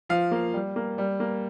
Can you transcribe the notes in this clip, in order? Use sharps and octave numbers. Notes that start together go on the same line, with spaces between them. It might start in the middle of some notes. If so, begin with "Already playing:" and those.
F3 F5
A#3
G3
A#3
G3
A#3